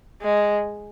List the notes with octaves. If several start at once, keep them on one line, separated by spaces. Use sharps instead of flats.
G#3